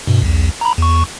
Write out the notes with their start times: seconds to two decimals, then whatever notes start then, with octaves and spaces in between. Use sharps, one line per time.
0.07 G2 B2
0.22 B1 E2
0.61 A#5 B5
0.78 E2 C#6